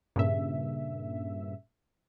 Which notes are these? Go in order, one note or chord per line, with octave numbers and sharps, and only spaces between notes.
G2 A#2 C#3 E5